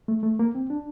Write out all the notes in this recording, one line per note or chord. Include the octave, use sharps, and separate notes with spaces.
A3
A3
A#3
C4
D4